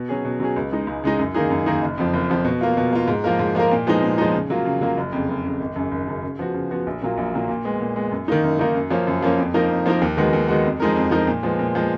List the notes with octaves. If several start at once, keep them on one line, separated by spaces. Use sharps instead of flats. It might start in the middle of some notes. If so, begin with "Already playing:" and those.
Already playing: B2
F#3 C#4 G#4
B2
F#3 C#4 G#4
C#2
C#3 G#3 D#4
C#2
C#3 G#3 D#4
F#2
D#3 A#3 D#4 G#4
F#2
D#3 A#3 D#4 G#4
F#1
F2 F3
F#1
F2 F3
B2
A#3 F4
B2
A#3 F4
G#2
F3 A#3 F4 A#4
G#2
F3 A#3 F4 A#4
A#2
F3 G#3 B3 D#4
A#2
F3 G#3 B3 D#4
C#3
F#3 A#3 F4
C#3
F#3 A#3 F4
F#1
F2 C#3
F#1
F2 C#3
G#1
F#2 C#3
G#1
F#2 C#3
C#3
F3 B3 F#4
C#3
F3 B3 F#4
A#1
A#2 F#3 A#3 F4
A#1
A#2 F#3 A#3 F4
A#2
G#3 B3
A#2
G#3 B3
F#2
D#3 A#3 D#4
F#2
D#3 A#3 D#4
F#2
F3 A#3 C#4
F#2
F3 A#3 C#4
F2
F3 A#3 D#4 A#4
F2
F3 A#3 D#4 A#4
D#2
D#3 G#3 B3 F#4
D#2
D#3 G#3 B3 F#4
F2
F3 G#3 D#4 A#4
F2
F3 G#3 D#4 A#4
A#2
F3 G#3 B3
A#2
F3 G#3 B3